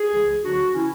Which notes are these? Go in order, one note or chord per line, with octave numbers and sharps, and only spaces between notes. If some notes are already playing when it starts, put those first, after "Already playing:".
Already playing: G#4
C#2 C#3 E3
D2 D3 F#3 D4 F#4
C#3 E3 C#4 E4